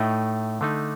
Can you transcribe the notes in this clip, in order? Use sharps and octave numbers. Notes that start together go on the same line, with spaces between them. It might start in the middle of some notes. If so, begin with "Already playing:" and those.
Already playing: A2 A3 D#4 D#5 G5
D3 A3 D#4